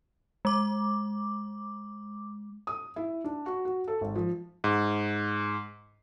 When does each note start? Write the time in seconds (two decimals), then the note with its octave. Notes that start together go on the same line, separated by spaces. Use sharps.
0.45 G#3 D6
2.67 D#6
2.96 E4
3.24 D4
3.46 F#4
3.65 F#4
3.88 A4
4.01 G#1
4.16 F3
4.64 G#2